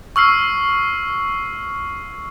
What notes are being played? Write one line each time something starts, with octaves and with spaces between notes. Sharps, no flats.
C#6 E6 F6 C7